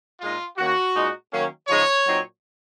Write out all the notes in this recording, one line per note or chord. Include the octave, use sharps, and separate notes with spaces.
A#2 G#3 D#4 F4
D#3 A#3 C#4 F#4
A#2 G#3 D#4
D#3 F#3 A#3 C#4
C#3 F3 G#3 D#4 C#5
A#2 F#3 C4 D#4